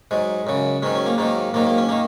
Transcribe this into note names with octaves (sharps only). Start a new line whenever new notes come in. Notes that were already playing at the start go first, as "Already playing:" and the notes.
G#2 F#3 G#3
F#2 C#3 F#3
G#2 D#3 F#3 C#4
C#4
A#3
G#2 D#3 F#3 A#3
G#2 D#3 F#3 A#3
A#3
C#4
D#3 A#3